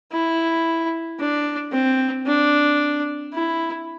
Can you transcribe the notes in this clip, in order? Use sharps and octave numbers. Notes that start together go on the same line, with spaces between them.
E4
D4
C4
D4
E4